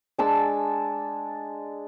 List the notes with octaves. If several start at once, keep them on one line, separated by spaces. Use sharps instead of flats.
G#3 D4 A5 E6